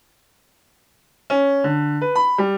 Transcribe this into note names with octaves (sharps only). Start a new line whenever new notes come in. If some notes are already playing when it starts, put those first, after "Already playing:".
C#4
D3
B4
B5
G3